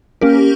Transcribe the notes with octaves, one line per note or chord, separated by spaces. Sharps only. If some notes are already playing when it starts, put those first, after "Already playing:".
A#3 C#4 G4 A#4